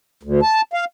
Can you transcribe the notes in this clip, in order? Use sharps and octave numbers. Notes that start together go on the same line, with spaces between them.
D2
A5
F5